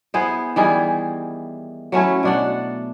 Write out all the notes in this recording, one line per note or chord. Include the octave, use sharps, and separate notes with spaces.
B3 E4 G#4 C5
D#3 E3 G3 G#4
F#3 A3 C#4 E4
B2 D4 F#5